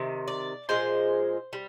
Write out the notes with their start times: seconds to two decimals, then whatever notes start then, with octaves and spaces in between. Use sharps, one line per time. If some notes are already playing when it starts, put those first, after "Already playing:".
Already playing: C3 D#3
0.28 D5
0.69 A#2 F3 G#3 C5
1.53 G3